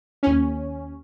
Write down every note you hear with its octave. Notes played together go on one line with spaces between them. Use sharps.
D#2 C#4